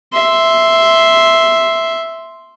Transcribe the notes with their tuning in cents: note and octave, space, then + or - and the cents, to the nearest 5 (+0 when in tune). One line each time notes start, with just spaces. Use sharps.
E5 +0 C6 +0